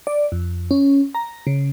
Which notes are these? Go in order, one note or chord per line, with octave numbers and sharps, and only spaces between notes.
D5
F2
C#4
A#5
C#3